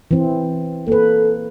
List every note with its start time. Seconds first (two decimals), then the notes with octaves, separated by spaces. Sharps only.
0.11 E3 C4
0.88 A#3 A4 B4